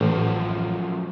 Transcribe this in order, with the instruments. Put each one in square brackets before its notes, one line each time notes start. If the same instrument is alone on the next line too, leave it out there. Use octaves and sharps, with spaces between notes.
[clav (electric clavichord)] A1 [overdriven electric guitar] F#2 F3